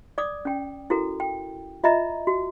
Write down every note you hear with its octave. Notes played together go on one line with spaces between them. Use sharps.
D5 D6 D#6
C#4 G5
E4 F#4 A4 A#4
G5
F4 D#5 E5 A#5
F#4